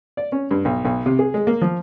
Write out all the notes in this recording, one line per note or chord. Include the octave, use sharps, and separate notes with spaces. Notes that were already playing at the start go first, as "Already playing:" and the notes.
D5
C#4
G2
B1
B1
C3
G#4
G#3
A#3
F3